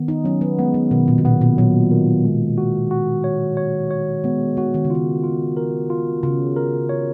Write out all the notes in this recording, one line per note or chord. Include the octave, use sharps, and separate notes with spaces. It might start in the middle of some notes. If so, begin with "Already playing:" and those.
Already playing: D#3 B3
D#4
F#3 C#4
B3
G#3 B3
D#3
B2 D#3
A#2
B2
A#2 B3
B2
A#2 F#3
D#3
G#3
F#4
F#4
C#5
C#5
C#5
G#3 B3
D#3 F#4
D#3
C#3
D#3 F4
F4
A#4
F4
C#3 F4
A#4
C#5